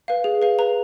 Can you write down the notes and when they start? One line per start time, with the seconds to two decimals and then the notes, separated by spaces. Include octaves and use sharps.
0.08 B4 F5
0.24 G#4
0.42 B4 F5
0.59 B4 A#5